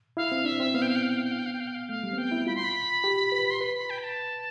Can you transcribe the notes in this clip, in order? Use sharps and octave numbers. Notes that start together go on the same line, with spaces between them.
E4 F5
C4
D4 E5
C4
B3 F5
G5
F5
G5
F5
G5
F5
G5
F5
G5
F5
G5
F5
G5
F5
A3 F5
G3
C4
B3 G5
E4
F4 B5
C6
B5
G4
B4
C6
B4 B5
B5
G5
B5
A5